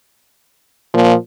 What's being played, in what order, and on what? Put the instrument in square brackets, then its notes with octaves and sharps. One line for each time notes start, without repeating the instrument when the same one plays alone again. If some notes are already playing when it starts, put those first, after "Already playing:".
[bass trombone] A#2 [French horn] F3